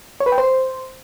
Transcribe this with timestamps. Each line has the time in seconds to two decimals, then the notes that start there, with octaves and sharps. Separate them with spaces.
0.20 C#5
0.26 B4
0.32 G5
0.38 C5